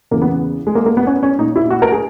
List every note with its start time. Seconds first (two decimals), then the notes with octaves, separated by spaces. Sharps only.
0.11 E2 C#3 E3 A#3
0.22 B3
0.67 G#3
0.75 A#3
0.86 A#3
0.97 B3
1.07 C#4
1.23 C#4
1.39 A#2 D#4
1.56 E4
1.70 F#4
1.82 A#4
1.92 G#4